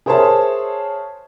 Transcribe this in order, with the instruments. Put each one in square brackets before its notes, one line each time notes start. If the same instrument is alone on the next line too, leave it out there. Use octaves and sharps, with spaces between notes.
[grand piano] G#4 A#4 C5 C#5 E5 A5